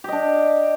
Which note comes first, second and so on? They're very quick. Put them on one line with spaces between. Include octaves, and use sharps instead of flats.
G4 D#5 D4